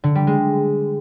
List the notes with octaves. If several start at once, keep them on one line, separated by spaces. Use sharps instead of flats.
D3
G3
G#3